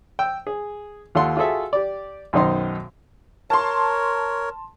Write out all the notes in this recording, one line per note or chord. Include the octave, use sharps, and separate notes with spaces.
G5 E6
G#4
D#2 F4 A4 F#5 C6
F4 F#4 G#4 A4 E5
G4 D5
B1 F#2 D#3 D#4 C5 C6
A#4 C#5 A5 C6